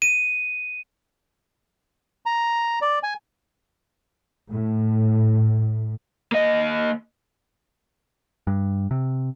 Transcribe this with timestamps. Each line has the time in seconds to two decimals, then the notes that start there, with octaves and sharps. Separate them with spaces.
0.02 D#7
2.26 A#5
2.81 D5
3.03 G#5
4.50 A2
6.32 A#3 D#5
8.47 G2
8.91 C3